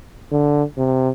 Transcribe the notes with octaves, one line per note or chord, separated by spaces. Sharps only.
D3
C3